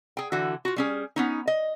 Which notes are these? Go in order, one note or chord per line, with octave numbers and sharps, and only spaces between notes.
G#4 G5
D3 E3 F#4
F4 F#4
G3 C#4 G#4
B3 C#4 D#4
D#5